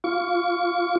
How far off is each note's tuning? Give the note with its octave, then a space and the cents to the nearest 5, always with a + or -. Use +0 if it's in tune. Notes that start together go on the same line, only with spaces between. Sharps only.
F4 +0 C#6 +35